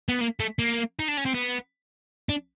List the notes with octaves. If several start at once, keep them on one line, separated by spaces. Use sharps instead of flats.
B3
A#3
A3
A#3
D#4
D4
C#4
C4
B3
D4